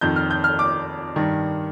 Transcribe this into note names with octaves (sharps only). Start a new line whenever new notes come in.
F2 D#3 G6
F6
G6
F6
D6
G2 D#3